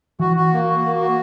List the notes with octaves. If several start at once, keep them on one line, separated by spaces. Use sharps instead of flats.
E3 F#4
F#4
A#3
F#4
A#3
F#4